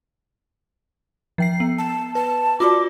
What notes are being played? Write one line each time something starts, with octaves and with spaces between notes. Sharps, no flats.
F3 G5 C7
B3
A5
B4 A5
F4 F#4 D5 D6